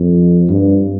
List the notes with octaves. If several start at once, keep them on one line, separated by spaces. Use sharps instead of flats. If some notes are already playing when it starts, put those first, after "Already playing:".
Already playing: F2
G2